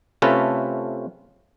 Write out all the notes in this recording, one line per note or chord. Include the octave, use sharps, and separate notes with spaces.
C3 A3 C#4 F4 A4 B4